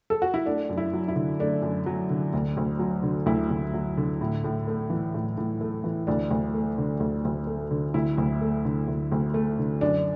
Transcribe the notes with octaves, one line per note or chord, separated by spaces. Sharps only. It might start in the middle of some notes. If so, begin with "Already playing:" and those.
A4
F#4
E4
A3 D4
F#2
E4
F#3
E4
D3
A3 D4
F#2
F#3
D3
D2
D2
F#3
D3
D2 E4
D2
F#3
D3
A2
A2
A3
E3
A2
A2
A3
E3
D2 D4
D2
A3
D3
D2
D2
A3
D3
D2 E4
D2
A3
D3
D2
D2
A3
D3
F#2 D4